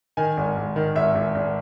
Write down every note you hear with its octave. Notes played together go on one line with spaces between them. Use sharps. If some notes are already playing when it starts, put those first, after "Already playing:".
D#3 G#5
G#1
G#1
D#3
G#1 E5
G#1
G#1